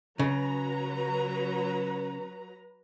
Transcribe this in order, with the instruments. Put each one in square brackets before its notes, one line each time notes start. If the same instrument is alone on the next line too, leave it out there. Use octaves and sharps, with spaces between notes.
[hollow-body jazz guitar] C#3 [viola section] F#3 B4 A#5